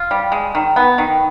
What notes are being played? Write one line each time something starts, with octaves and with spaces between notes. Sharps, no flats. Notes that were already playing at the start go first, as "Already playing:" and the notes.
Already playing: F4
G3
G#3
D#3
B3
D#3